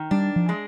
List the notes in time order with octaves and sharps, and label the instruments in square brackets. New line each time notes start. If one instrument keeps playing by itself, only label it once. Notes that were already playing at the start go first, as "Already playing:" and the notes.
Already playing: [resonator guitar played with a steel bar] D#3
[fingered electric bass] G3 [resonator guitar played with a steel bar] D4
[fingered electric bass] F3
[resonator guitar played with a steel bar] G#3